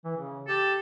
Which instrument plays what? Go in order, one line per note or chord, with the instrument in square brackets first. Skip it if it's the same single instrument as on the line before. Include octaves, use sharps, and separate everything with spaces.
[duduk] E3
C#3
[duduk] G4 [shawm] A4